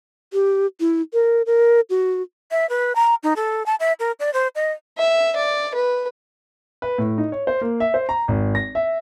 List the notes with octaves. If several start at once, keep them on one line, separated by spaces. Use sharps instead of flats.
G4
E4
A#4
A#4
F#4
E5
B4
A#5
D#4
A4
A5
E5
A#4
D5
C5
D#5
E5
D5
B4
B4
A2
D#4
C#5
C5
A#3
E5
C5
A#5
G#1
A#6
E5